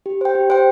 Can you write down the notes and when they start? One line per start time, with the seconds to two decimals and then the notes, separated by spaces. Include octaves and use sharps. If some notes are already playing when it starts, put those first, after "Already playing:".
0.06 G4
0.21 C5 G5
0.35 G4
0.50 C5 G5